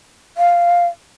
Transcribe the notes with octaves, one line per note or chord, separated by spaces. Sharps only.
F5